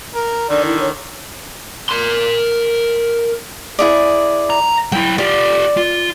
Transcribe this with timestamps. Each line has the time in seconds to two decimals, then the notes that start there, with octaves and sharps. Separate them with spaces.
0.14 A#4
0.49 D3 D#3 D5
0.65 E4
0.80 C#5
1.89 A#4 C6
3.79 E4 G#4 D5
4.50 A#5
4.92 F#3 E4 G5
5.18 F4 G4 D5
5.77 F4